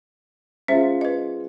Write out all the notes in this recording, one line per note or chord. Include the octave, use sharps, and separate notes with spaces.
G#3 C#4 F4 C5 E5
B4 D#5